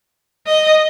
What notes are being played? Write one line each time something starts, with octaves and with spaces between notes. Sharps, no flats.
D#5